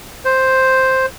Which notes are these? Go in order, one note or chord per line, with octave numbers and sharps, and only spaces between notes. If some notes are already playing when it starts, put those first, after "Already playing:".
C5